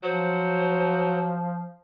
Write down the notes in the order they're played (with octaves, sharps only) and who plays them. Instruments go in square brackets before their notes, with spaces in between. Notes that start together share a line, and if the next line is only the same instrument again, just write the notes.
[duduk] F3 [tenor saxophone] F#3 [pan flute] C5